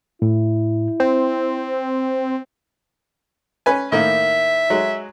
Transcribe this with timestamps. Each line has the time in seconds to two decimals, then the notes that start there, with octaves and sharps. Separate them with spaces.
0.22 A2 E4
1.00 C4 C5
3.66 C#4 B4 G#5
3.92 A2 D#3 A#3 E5
4.70 F#3 G#3